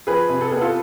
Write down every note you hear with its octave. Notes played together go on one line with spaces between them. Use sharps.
F3 G#4 B4
C3
A4
B3 G#4
F4 A4